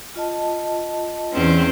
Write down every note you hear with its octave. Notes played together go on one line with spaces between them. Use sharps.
F4 D#5 A5
E2 C4 C#4